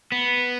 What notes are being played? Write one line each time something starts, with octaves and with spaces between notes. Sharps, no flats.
B3